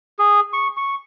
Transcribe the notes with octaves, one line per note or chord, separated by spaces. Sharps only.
G#4
C#6
C#6